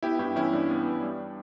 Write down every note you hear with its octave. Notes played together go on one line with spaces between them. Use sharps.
B3 E4 G4
G2 E4 G4
E3 C#4 E4
G2 D4
B3
G2
G3